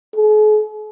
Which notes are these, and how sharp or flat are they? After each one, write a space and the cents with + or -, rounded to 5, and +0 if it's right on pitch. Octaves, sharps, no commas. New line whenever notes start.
G#4 +45